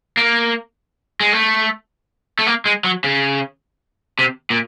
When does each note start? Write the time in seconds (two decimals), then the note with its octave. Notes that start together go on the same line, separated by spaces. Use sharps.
0.17 A#3
1.20 G#3
1.33 A3
2.39 A3
2.47 A#3
2.66 G#3
2.84 F#3
3.04 C#3
4.19 C3
4.50 A#2